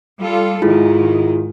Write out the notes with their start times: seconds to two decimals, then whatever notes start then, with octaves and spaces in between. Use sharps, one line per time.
0.21 G3 F4 A4
0.62 G#2 D#3 E4 F4 G#4